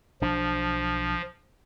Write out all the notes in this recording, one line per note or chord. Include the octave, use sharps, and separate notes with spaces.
B1 F3 D4